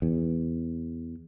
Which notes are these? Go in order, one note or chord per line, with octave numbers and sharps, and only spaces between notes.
E2